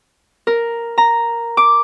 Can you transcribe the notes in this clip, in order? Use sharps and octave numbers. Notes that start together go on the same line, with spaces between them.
A#4
A#5
D6